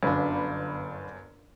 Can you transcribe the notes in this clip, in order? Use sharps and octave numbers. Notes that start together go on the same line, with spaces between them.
G1 F#2 D4 B5